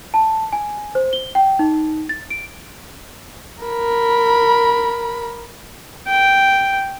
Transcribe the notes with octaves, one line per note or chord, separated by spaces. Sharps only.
A5
G#5
C5
G7
G5
D#4
A6
D7
A#4 B5
G5